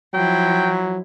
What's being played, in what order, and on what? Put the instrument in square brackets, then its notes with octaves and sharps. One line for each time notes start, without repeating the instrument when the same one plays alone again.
[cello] F3 E4 [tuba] F#3 [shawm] G5